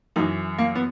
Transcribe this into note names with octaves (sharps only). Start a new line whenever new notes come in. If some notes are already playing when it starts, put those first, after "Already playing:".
F#2 E3 D#4
A#3
B3